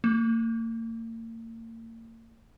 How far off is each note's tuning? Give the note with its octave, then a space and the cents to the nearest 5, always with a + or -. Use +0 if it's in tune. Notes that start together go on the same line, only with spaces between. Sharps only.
A#3 -40